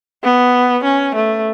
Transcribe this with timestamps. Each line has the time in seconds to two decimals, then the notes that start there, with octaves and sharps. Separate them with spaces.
0.23 B3
0.84 C#4
1.15 A3